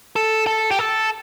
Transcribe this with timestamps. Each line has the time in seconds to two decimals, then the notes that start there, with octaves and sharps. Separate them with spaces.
0.16 A4
0.47 A4
0.71 G4
0.79 A4